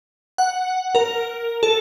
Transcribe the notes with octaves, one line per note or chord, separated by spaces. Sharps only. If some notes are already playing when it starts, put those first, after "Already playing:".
F#5
A#4
A4